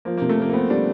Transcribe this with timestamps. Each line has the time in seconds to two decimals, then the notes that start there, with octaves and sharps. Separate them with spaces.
0.05 F3 A#3
0.17 C3 A#3
0.29 A3
0.37 F3 A#3
0.50 A#3
0.53 B3 C4
0.70 G3 D4